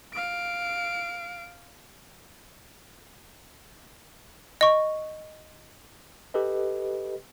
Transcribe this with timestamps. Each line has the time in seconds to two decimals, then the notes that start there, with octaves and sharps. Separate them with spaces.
0.13 F5 D7
4.61 D#5 C#6
6.34 G4 A4 B4 D#5